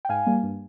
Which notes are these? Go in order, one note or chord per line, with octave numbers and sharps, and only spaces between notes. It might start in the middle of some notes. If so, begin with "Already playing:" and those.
G5
G#2 F5 G#5
G3 A#3
G2